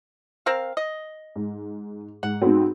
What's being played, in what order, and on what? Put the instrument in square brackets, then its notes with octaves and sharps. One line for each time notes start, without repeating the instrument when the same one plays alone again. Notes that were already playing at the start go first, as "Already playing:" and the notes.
[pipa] C4 A#4 F5
D#5
[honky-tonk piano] G#2
[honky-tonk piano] G#2 [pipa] F#5
[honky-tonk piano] G#2 B3 C4 [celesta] D#4 F#4